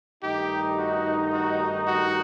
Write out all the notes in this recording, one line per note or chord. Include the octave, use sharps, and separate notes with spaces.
G2 D#3 A3 D#4 G4
F#4
F#4
F#4